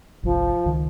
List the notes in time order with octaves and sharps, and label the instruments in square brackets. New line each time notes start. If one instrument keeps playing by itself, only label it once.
[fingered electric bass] G1 C2 [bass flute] F3
[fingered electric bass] C#2 D#3